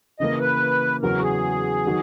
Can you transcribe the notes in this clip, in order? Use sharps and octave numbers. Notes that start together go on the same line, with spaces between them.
C#3 E3 A#3 D#5
B4
E2 C#3 F#3 A#4
F#4
G#4
D#3 F#3